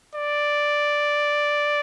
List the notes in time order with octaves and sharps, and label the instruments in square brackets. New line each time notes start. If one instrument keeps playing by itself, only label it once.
[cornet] D5